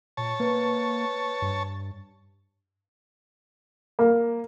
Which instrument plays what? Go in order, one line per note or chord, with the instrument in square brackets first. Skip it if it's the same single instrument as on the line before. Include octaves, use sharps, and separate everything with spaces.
[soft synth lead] A#2 [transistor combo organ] C#5 A5
[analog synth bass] A#3 [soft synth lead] B4
[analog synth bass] G2
[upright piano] A#3